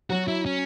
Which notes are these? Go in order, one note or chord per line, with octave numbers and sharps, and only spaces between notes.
F#3 F#4
E4
C#4